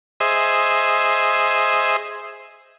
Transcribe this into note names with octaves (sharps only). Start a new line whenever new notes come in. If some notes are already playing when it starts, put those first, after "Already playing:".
G#4 C5 D#5 E5